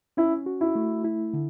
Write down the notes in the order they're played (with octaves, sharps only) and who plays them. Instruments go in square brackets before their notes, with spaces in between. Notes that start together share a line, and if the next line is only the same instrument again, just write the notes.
[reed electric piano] C#4 [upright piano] E4
[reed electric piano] F#4
[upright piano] E4
[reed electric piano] A3
E4
D3